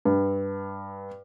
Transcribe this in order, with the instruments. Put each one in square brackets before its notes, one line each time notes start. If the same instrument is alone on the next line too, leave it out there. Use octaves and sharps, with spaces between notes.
[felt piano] G2